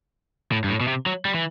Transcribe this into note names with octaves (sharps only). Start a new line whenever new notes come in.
A2
G2
A2
B2
C3
F#3
G3
E3